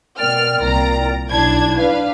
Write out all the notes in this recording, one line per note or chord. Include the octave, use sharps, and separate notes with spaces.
B2 A#4 D5 G5 F6
C2 A#2 A#5
B1 D4 E4 G#6
D4 B4 F5